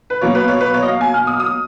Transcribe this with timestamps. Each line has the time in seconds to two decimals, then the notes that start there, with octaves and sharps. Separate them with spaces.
0.10 B4
0.21 B2 F#3 A#3 C#5
0.35 B4
0.48 C#5
0.61 B4
0.74 C#5
0.83 D#5
0.88 F5
1.01 G#5
1.14 F6
1.27 D#6
1.40 D#6